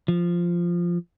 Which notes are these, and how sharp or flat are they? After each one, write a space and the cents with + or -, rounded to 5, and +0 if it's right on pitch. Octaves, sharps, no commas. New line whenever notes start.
F3 -5